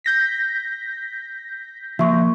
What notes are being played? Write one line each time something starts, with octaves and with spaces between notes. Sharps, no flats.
G6 A#6 B6
F3 A#3 E5 C#6